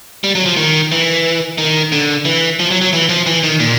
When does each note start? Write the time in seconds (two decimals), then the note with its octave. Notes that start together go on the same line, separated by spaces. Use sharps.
0.24 G3
0.35 F#3
0.46 F3
0.57 D#3
0.92 E3
1.58 D#3
1.92 D3
2.25 E3
2.59 F3
2.71 F#3
2.82 F#3
2.93 E3
3.09 F3
3.26 E3
3.43 D#3
3.60 A#2